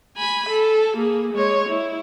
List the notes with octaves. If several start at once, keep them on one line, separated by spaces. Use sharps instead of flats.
G#5 B5
A4
A#3 G#4
G#3 C#5
E4